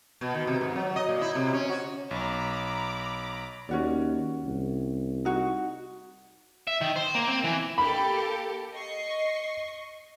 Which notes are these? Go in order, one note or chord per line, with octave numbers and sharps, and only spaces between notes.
B2
D#3
C3
G#2
F#3
D#5
A#2
E4
C3
C#4
F#4
B1 A#5 B5 D6
D#2 C#4 F#4 D5
C2
D#4 F#4
E5
D#3
C5
A#3
C4
E3
A#3 G4 A4 B5
D#5 C#6 C7